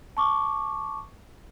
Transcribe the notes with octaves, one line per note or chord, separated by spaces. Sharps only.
A5 C#6 D6